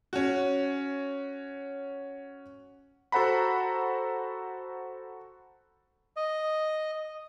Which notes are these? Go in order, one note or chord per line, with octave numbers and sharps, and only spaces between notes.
C#4 F#4
F#4 A4 C5 F#5 A#5 B5
D#5